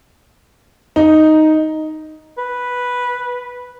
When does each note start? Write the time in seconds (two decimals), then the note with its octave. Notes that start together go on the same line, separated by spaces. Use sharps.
0.96 D#4
2.38 B4